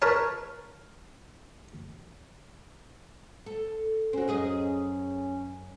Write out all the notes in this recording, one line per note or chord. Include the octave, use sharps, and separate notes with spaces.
A#4 B4 C#5 A5
A4
C4 C#4 F#4
F#2 G#4 D#5